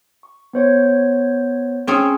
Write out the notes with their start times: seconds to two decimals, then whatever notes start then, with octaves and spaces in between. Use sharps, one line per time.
0.23 C#6
0.53 B3 C5 C#5
1.87 C4 C#4 G#4